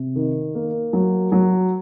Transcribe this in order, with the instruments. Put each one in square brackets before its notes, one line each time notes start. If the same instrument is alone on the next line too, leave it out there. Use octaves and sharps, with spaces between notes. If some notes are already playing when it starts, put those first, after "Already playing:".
Already playing: [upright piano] C3
D#3
A#3
F#3
F#3